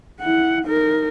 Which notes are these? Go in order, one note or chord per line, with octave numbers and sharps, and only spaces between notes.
E4 F#5
D#4 A#4